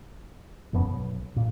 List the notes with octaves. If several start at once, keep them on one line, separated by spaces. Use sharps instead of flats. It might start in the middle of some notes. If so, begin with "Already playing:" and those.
E1 F#2 F3 B3
B1
A#2